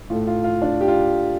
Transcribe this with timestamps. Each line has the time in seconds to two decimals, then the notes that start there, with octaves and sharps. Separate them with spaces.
0.10 A2 F4
0.13 A3
0.27 F4
0.44 F4
0.62 D4
0.81 G4
0.88 F4